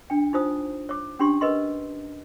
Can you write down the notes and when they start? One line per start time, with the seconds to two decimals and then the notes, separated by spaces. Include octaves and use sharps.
0.10 D4 G5
0.33 D#4 F4 C5 D#6
0.89 C#5 D6
1.19 C#4 D4 G4 C6
1.41 A#4 B4 D#5 C6